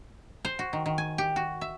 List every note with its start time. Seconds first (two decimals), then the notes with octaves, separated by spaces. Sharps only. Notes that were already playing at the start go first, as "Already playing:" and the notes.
0.45 C5
0.59 F#4
0.73 D#3
0.86 D#3
0.98 G#5
1.18 G4
1.36 F#4
1.61 E5